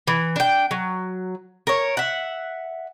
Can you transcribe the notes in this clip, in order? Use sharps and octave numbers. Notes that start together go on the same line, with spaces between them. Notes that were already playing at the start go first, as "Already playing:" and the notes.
E3
D4 G5
F#3
A#4 C#5
E5 F#5